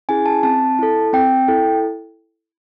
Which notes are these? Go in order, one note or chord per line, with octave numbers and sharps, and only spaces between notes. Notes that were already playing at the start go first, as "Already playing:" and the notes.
C#4 E4 G#4 G#5
A5
C4 A5
E4 A4
C4 G5
E4 A4